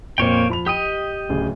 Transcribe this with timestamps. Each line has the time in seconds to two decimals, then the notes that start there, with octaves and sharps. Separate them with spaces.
0.18 F2 A#2 A#3 C4 C#5 G5
0.50 F3 B5 F7
0.67 G4 D#5 G5 D#6
1.29 D1 C#3 G#4